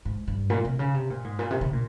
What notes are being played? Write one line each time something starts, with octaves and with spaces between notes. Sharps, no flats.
G#2
G2
A#2
C3
C#3
C3
A#2
G#2
A#2
C3
C#3
A#2